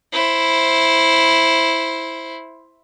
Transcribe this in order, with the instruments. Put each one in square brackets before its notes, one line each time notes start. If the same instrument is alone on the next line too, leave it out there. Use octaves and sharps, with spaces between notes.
[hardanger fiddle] E4 C5